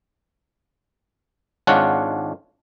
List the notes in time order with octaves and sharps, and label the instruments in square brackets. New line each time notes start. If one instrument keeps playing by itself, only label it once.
[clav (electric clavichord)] G#1 G#2 D4 F4 C#5 F#5